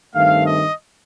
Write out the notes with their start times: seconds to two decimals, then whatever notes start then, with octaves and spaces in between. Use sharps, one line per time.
0.15 G2 D#3 A3 C4 F5
0.46 D#5